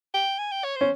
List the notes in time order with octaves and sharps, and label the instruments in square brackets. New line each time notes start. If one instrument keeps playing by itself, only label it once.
[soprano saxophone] G5
G#5
G5
C#5
[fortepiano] C#4 [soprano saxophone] C5